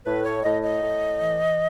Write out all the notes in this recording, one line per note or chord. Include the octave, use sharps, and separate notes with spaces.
A2 B4
C#5
A2 D#5
D#5
A2
E3